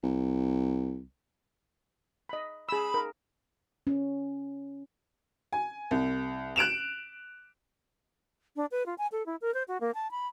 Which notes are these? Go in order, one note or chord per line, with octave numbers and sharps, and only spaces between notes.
C2
D#5 B5
G#4 B5 E6
A#4
C#4
G#5
C2
F#6 D7 E7 F7
D4
B4
F4
G#5
A4
E4
A#4
C5
F#4
A#3
A5
B5